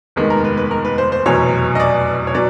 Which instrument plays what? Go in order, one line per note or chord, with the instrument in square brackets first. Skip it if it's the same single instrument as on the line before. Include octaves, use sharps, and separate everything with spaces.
[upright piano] F1 D#2 D#3 G#3 B3
A#4
B4
B4
A#4
B4
C5
C5
F1 E2 B2 F#3 C#5
D#5
D5
C#5
B2 F#3 D5